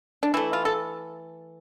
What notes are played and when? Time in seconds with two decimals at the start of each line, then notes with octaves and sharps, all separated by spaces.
0.23 D4
0.34 E3 A3 E4
0.53 F4
0.65 A4